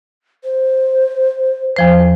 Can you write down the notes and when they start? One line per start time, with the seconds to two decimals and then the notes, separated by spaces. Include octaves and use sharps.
0.44 C5
1.76 E2 F3 C5